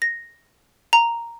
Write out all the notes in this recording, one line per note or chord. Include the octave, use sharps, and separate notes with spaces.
A#6
A#5